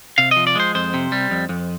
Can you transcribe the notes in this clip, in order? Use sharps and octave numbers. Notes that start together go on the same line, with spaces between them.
C3 F5
F3 D#5
D5
G#3 C5
F2 C5
C3
G3
F2
F2